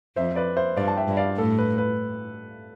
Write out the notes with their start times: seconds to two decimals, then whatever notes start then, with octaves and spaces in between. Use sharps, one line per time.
0.16 F2 C5 E5
0.36 B4 D5
0.56 C5 E5
0.77 G2 D5 F5
0.88 A5
0.97 E5 G5
1.08 G2
1.17 D5 F5
1.37 A2 A4
1.58 B4
1.78 B4